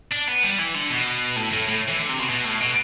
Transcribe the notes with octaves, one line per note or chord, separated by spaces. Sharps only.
D4
B3
G3
E3
D3
B2
A2
A2
A2
E3
D3
C3
B2
B2
A2
B2